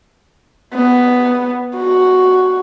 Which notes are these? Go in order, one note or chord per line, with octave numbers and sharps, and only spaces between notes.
B3
F#4